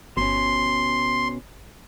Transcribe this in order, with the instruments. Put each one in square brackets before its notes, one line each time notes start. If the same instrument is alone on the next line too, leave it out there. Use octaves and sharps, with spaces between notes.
[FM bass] G1 [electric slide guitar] B2 C#4 [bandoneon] C6